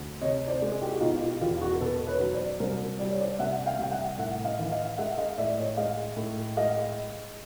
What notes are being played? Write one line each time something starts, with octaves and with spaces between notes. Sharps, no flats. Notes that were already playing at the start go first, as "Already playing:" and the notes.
Already playing: D2
C3 C#5 D#5
C5 D5
G#3
G#4
G4
F#4
B2 D#4 F4
F4 G4
E2 F4 G4
F#4 G#4
A#4
B2 A4 B4
B4 C#5
F#3
C5 D5
C2 A#4 C5
G3 D5
C#5
C5 D5
C2 E5 F#5
F5 G5
C2 G5
E5 F#5
A2 E5 F#5
D#5 F5
E3
D#5 F5
G#3 E5 F#5
D#5 F5
A2 D5 E5
C#5 D#5
G#3 D#5 F5
A2
G#3 D#5 F5